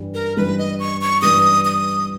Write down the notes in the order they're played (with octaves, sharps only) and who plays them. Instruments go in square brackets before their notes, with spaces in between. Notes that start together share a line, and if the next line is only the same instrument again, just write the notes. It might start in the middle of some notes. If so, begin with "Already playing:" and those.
Already playing: [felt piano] G2 E3 G3
[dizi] A#4
[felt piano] G2 E3 G3 [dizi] B4
[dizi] D#5
C#6
C#6
[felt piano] G2 E3 G3 [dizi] D#6
[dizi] D#6